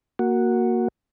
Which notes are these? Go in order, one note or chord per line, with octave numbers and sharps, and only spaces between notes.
A#3 F#4